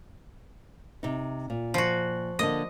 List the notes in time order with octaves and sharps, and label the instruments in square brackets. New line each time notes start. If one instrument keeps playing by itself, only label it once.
[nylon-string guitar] C3 D#4
A#2
[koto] F3 F#4
[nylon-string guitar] D3 A#3 [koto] D#5